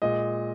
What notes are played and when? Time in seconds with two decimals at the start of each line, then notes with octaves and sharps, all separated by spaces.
0.02 A#2 G#3 D#5